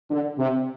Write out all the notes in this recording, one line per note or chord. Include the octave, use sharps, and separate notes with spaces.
D3
C3